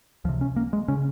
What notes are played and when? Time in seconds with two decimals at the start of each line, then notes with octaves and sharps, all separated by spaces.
0.24 C#2 F3
0.29 C3
0.41 C#4
0.56 A#3
0.73 G#3
0.88 C#3 C#4